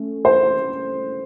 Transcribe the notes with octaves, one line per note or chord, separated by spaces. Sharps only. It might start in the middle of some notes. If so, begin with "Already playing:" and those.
Already playing: A3 C#4
C5